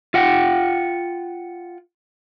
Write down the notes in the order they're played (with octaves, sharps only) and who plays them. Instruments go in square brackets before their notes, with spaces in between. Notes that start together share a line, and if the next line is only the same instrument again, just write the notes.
[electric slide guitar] F4 F#5 G5